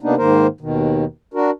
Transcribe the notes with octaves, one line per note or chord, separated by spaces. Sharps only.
C3 A#3 B3 D4 D#4
G#2 D#3 A#3 A#4 C5
D#2 B2 D#3
D4 F#4 A#4